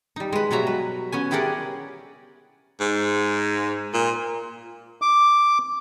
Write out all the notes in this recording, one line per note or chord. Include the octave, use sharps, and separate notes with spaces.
G3 D#4
G#3 B4
B2 F#3 G3 F#4 E5 A#5
B4
B3 C#4 G#5
E4 G4 G#4 A#4 D5 F#5
G#2
A#2
D6